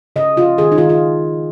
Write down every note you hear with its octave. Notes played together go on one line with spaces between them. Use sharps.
C#3 D#5
C#3 F4
D#3 G#4
D#4
D#3 F4
F4